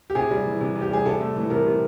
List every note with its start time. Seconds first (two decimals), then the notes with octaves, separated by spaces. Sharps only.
0.10 G4
0.15 C3 G#4
0.31 G3
0.45 E3
0.61 C3
0.75 C3
0.82 G4
0.91 G3 G#4
1.05 C3 A4
1.21 A3
1.36 E3
1.50 C3 A#4
1.66 C3